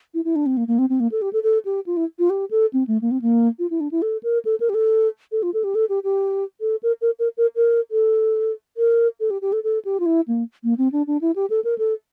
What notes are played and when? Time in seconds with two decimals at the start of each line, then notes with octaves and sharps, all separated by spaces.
0.14 E4
0.25 E4
0.36 D4
0.46 C4
0.57 A#3
0.68 A#3
0.79 C4
0.89 C4
1.00 A#3
1.12 A4
1.22 G4
1.33 A4
1.43 A4
1.65 G4
1.86 F4
1.97 E4
2.19 F4
2.30 G4
2.51 A4
2.73 C4
2.87 A3
3.02 A#3
3.11 C4
3.22 A#3
3.59 F4
3.70 E4
3.80 D4
3.91 E4
4.02 A4
4.23 A#4
4.45 A4
4.60 A#4
4.69 G4
4.74 A4
5.32 A4
5.43 F4
5.54 A4
5.64 G4
5.75 A4
5.89 G4
6.04 G4
6.61 A4
6.83 A#4
7.01 A#4
7.19 A#4
7.37 A#4
7.56 A#4
7.91 A4
8.77 A#4
9.20 A4
9.30 G4
9.42 G4
9.53 A4
9.64 A4
9.85 G4
10.00 F4
10.06 E4
10.28 A#3
10.64 A#3
10.78 C4
10.92 D4
11.07 D4
11.21 E4
11.36 G4
11.50 A4
11.64 A#4
11.78 A4